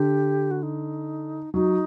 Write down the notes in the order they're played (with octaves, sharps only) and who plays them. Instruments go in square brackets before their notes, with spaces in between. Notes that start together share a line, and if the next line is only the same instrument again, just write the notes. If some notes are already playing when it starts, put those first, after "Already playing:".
Already playing: [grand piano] D3 [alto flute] G4
[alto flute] F#4
D#4
[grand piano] F#3 [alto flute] D#4